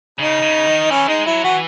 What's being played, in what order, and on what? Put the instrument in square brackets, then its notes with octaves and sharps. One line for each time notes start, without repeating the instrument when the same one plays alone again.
[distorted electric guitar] C#3 [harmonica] D#4
[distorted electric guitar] C#3
D#3
[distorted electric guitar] E3 [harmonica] C#4
[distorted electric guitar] G#3 [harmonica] D#4
[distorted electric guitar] F#3 [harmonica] E4
[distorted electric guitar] E3 [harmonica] F#4